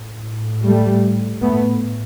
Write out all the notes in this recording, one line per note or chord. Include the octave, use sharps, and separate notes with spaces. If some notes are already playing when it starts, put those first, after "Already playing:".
Already playing: A2
G3 A3
A2 A3 B3